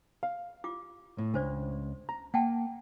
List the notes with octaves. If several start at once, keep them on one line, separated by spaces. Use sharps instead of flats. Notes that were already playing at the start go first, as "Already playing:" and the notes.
F5
F4 G4 D6
A2
C#2 D4 C5 D5
A#5
A#3 F#5 G5 A5